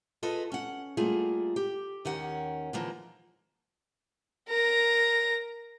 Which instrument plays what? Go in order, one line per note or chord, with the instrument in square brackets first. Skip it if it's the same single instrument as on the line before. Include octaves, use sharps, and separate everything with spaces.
[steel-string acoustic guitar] F4 G#4 A4 B4 D#5
C#4 F#5
G3 A3 A#3 F4 G#4
G4
D#2 D#3 C#4 F#5
D3 E3 F3 G#3 A#3
[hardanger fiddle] A#4 A#5